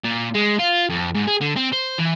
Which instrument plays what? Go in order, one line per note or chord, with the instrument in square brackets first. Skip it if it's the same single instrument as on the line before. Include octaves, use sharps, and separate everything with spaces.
[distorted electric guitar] A#2
G#3
F4
F2
G#2
G#4
D3
C4
C5
E3